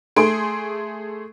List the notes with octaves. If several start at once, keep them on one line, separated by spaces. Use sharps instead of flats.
A3 G#4 C6 D7